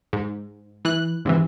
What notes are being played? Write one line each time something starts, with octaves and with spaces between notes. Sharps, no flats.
G#2
E3 F#6
G#2 C3 E3